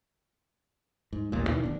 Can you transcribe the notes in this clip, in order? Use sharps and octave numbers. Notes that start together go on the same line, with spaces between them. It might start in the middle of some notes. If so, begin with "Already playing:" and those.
G#2
A1 D#2 A#2
B2 D#3 E3
D1 D4